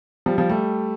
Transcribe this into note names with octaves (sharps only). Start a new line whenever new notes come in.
F3 G3
F3 G3
G3 A3